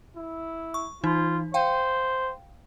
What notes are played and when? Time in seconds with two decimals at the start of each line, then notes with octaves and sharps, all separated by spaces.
0.16 E4
0.74 C#6
1.04 E3 D#4 F4
1.54 C5 F5 G5